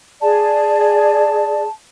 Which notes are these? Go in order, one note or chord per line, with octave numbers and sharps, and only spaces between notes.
G#4 D5 A5